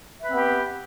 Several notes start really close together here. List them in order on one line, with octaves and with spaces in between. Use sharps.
E5 B4 C4 B3 G4